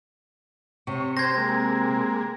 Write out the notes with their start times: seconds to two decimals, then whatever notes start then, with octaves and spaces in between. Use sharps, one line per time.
0.87 C3 C#5
1.17 C4 G4 C5 G#6 A#6
1.37 G#3 A#3 C4